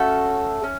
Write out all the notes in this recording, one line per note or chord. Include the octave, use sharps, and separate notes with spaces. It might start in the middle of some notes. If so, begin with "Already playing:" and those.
Already playing: A3 C#4 F#4 A4
C#4